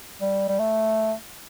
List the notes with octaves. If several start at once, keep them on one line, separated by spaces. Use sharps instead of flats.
G3
G3
A3